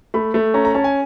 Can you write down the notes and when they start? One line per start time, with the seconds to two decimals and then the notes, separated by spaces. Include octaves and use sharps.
0.14 A3 B5
0.34 A3
0.54 C#4 A#5
0.65 A#5
0.75 C#4 A5
0.84 G#5